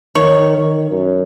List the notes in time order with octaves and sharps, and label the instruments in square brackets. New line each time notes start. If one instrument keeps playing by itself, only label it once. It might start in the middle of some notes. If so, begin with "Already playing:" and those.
[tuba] D#3 [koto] C#5
[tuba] D#3
F#2